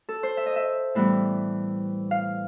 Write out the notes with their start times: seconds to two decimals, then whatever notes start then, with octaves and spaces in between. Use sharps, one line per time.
0.09 A4
0.23 C5
0.37 E5
0.46 D#5
0.56 E5
0.95 A2 E3 G3 B3
2.11 F5